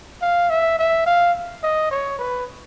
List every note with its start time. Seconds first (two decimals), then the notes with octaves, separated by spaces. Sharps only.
0.22 F5
0.50 E5
0.79 E5
1.07 F5
1.63 D#5
1.91 C#5
2.19 B4